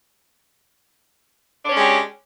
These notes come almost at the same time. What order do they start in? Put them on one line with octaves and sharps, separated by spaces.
D4 C#5 C#4 G#3 G4